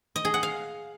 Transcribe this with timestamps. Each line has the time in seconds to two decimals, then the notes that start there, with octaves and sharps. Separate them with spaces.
0.16 D#5
0.25 G#4
0.34 F#5
0.43 F5